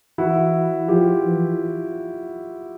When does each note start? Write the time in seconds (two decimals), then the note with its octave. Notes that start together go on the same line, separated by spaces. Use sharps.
0.18 E3 E4 F#4
0.88 F3 F4 G4
1.24 E3